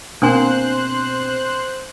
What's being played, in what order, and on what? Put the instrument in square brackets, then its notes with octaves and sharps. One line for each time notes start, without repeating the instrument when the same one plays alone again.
[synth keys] B2 C4 [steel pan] A#3 [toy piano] D4 G#5 C6 [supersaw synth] C5 F#6